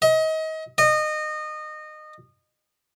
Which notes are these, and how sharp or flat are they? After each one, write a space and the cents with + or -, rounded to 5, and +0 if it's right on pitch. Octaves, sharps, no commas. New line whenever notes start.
D#5 +30
D#5 -25